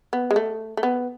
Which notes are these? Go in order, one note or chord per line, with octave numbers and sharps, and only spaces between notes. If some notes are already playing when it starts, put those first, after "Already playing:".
B3
G#3
A3
A3
B3